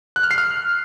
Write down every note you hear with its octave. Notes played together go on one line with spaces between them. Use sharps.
F#6
F6
C7
F6